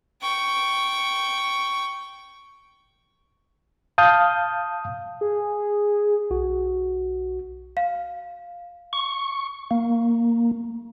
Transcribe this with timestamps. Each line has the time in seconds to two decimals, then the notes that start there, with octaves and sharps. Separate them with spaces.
0.21 G5 C#6
3.98 F5 A5 D#6 G6
5.21 G#4
6.30 B1 F#4
7.77 F5
8.93 C#6
9.71 A#3